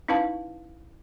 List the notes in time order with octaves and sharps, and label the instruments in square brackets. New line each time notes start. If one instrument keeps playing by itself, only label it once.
[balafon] C#4 D#4 E4 B4 F5 A5